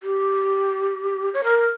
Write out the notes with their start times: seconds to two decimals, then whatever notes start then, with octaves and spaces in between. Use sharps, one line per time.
0.03 G4
1.34 C#5
1.44 A#4